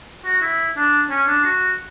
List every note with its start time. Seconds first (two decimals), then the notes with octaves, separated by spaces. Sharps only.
0.25 F#4
0.42 E4
0.77 D4
1.10 C#4
1.27 D4
1.45 F#4